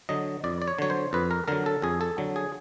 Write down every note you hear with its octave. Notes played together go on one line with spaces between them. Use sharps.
D3 F#3 D#5
F2 D5
D5
C#5
D3 F#3 C#5
C5
F2 B4
A#4
D3 F#3 A#4
A4
F2 G#4
A4
D3 F#3
G#4